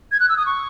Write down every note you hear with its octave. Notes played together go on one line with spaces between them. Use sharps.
G#6
F#6
E6
D#6
C#6